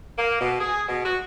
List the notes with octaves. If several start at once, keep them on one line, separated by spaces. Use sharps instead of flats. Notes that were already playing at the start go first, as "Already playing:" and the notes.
A#3
B2
G#4
B2
F#4